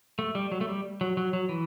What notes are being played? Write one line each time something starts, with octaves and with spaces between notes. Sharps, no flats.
A3
G3
F#3
A3
G3
F#3
F#3
F#3
E3